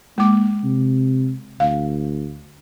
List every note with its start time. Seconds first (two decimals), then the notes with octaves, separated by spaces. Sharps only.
0.18 G#3 A#3 D6
0.64 C3
1.60 D2 F5